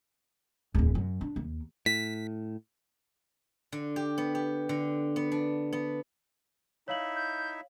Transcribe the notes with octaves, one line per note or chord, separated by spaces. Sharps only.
D1 E2
F#2
D4
D#2
A2 B6
D3
G4
B3
G4
D3
B3
D4
B3
D#4 E4 C#5 E5 F5 F#7
G6